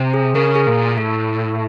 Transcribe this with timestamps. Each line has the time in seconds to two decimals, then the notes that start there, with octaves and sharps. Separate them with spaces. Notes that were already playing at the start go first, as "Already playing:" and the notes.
Already playing: C3
0.14 G#4
0.35 C#3 A#4
0.55 G#4
0.67 A#2
0.97 A2 A4